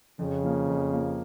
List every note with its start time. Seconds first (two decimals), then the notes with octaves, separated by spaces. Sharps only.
0.19 F2 C#3
0.43 F3 A#3
0.68 F2
0.92 F3 A#3